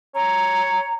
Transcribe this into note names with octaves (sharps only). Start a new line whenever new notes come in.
C#5 A#5